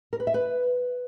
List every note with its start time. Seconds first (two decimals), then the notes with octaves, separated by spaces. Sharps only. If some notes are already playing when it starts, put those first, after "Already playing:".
0.13 A#4
0.20 B4
0.27 E5
0.34 B4